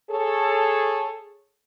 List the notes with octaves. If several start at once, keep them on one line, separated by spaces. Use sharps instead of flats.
G#4 A4 C#5